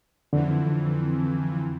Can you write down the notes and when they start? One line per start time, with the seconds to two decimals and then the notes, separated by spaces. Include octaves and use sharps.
0.33 F2 D3 E3